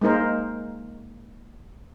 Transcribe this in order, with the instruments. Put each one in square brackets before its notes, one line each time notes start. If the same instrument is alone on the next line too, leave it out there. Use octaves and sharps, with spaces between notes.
[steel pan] G#3 A#3 D#4 A#4 C5